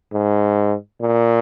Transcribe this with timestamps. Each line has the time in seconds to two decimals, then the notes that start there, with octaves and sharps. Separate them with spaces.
0.12 G#2
1.01 A#2